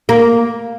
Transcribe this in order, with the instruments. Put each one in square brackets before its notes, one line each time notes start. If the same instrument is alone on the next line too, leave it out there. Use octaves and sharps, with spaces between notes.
[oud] A#3